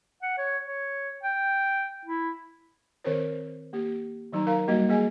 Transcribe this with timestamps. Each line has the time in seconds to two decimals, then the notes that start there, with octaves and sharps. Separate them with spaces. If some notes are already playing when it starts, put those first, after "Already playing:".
0.23 F#5
0.38 C#5
0.67 C#5
1.23 G5
2.05 E4
3.04 D#3 C4 A#4 C5 C#5
3.73 A#3 G4
4.33 D#3 F#3 D#4 A#5
4.46 A#4 F5 A#5
4.68 G3 A#3 F#4 D#5
4.89 A#3 G#4 D#5 G#5